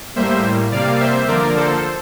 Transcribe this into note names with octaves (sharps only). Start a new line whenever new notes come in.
A2 G3 A#3 C5 E5
C3 G3 A#3 D5 F5
C5 E5
D3 F3 A#3 A#4 D5
A4 C5